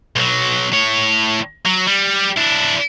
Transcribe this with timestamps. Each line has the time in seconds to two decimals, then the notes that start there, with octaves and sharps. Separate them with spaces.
0.16 B1 F#3
0.72 A2 C#5
1.65 F#3
1.87 G3
2.37 D4 E4